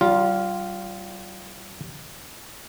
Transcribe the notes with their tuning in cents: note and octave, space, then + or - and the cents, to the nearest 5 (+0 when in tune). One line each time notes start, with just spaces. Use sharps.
G3 -35 F4 +0